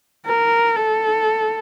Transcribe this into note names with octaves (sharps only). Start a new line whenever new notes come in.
A#4
A4